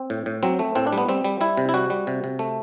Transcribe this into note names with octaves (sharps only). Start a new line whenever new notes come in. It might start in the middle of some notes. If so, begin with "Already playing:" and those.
Already playing: C4
A2
A2
F#3 C4
A3
A2 C4
D4
G3 B3
G3 C4
G3
G3 E4
C3
E4
G3 F#4
G3
C3
C3
A3